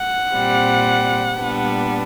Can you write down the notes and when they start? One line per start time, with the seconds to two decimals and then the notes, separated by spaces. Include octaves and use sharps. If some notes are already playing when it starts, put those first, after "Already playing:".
Already playing: F#5
0.31 A#2 G3 C4
1.37 A#2 G3 B3 D4